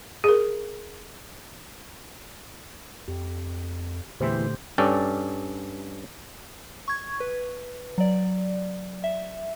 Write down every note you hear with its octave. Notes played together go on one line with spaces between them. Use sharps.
G#4 A#4
F2 G4
E2 A#2 D3 E3 A3 G4 C5 E5
G2 C#4 A4 D5 G5
C#6 G#6
B4
F#3 D5
E5